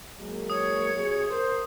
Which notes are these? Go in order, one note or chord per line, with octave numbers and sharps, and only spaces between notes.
F#3 G#3 A#3
C#5 D#6
C3 F#4 G#4
A#4 C5